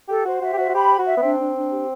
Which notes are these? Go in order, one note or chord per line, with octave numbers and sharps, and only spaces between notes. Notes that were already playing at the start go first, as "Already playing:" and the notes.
G4 A4
F#4 C5
F#4 E5
G4
F#4 C5
F#4
G4 B5
C5
F#4
E5
B3
C4 D4
D4
D4
G4